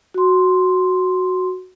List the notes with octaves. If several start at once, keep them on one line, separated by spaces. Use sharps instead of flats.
F#4 C6